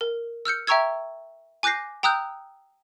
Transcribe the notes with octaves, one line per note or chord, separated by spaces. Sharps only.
A#4
E6 F6 G6 C#7
E5 G5 A#5 C#6 E6 G#6
G#5 D6 F#6 G6 A#6 C7
G5 A#5 D#6 E6 F#6 G6